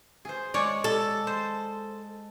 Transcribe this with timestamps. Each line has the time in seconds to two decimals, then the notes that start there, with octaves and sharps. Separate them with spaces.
0.25 G#4 C5
0.54 G#3 C#5 D5
0.84 A4
1.27 C5